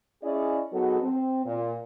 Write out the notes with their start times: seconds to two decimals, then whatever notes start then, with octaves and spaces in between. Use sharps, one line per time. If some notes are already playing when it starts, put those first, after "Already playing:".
0.23 C#4 E4 G#4 D5 D#5
0.72 F#3 B3 D#4 F#4 G#4 A4
1.02 C4
1.45 A#2